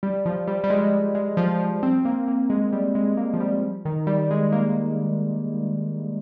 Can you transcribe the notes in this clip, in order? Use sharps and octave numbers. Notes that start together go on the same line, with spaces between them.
G3
F3
G3
G3
G#3
G#3
F3
F3
C4
A#3
A#3
G#3
G3
G#3
A#3
F3
G3
D#3
G3
G#3
A#3